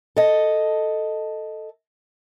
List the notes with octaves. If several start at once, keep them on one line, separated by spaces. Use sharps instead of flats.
A4 D#5